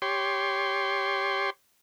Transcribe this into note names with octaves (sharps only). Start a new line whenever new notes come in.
G4 C#5 C6